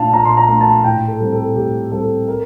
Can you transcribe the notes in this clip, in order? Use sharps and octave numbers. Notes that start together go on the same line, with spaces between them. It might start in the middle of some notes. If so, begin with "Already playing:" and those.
Already playing: A#2 A3 D4 F5 A5
A#2 A#5
C6
A#5
A3 D4
A5
A2 G5
A4
G3 C4
A4
A2 G4
G3 C4 A4
A#4